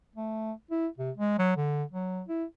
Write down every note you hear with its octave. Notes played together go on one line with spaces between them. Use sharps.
A3
E4
C3
G#3
F#3
D3
F#3
E4